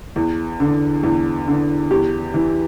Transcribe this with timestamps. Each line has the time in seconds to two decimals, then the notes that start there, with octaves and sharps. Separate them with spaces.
0.16 E2
0.60 D3
1.03 E2
1.48 D3
1.91 E2 G4
2.34 E3